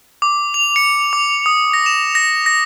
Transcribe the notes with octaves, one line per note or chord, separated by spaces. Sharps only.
D6
F7
C#7
D6
D#6
A#6
E7
A#6
A#6